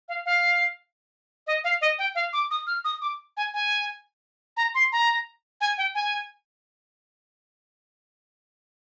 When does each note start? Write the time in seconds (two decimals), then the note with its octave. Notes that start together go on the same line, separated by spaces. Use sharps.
0.09 F5
0.26 F5
1.47 D#5
1.64 F5
1.81 D#5
1.99 G5
2.15 F5
2.33 D6
2.51 D#6
2.67 F6
2.85 D#6
3.02 D6
3.37 G#5
3.54 G#5
4.57 A#5
4.75 C6
4.92 A#5
5.61 G#5
5.78 G5
5.95 G#5